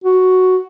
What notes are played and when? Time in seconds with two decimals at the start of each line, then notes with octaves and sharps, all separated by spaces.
0.04 F#4